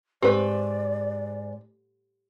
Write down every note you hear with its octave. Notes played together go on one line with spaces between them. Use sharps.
G#2 C4 G4 B4 D5